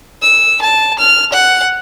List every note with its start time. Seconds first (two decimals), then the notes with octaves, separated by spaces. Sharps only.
0.22 E6
0.62 A5
0.99 F6
1.33 F#5